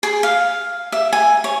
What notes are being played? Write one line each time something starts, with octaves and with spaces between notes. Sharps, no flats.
G#4
F5
E5
G#5
C#5